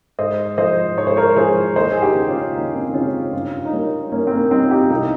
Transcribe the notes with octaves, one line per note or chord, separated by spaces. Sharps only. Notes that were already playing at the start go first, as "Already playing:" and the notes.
G#2 C5 D#5
F3 G#3 C5 D#5
G#2 C#5
C5
A#4 C#5
F3 G#3 G#4 C5
D#2 C5 D#5
G#4
D#4 G4
C#3 G#3
C#4 F4
D#2 D#4
F4
C4 D#4
C#3 G#3 C#4 F4
G2 C#4 F4
D#4
G3 A#3 C#4
G2 A#3 C#4
C4
A#3 C#4
G3 C4 D#4
F4
D#4 G4
C2 C4 D#4